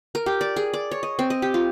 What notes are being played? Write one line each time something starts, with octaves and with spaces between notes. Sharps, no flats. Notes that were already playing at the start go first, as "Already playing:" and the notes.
A#4
G4
D5
G#4
D5
C#5
D#5
C4
D#5
G4
F4